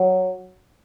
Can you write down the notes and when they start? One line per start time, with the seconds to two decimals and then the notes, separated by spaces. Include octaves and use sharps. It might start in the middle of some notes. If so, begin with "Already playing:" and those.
Already playing: F#3